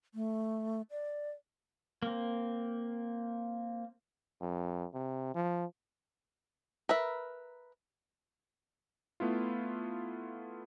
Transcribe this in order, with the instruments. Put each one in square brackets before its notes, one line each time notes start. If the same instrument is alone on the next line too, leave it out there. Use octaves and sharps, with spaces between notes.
[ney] A3
D5
[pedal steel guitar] A#3 C4
[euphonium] F2
C3
F3
[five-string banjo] A#4 B4 E5
[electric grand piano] A3 B3 E4 F4